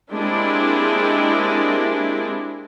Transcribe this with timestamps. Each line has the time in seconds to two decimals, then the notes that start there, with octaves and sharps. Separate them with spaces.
0.11 G#3 A#3 C4 D4 E4 G4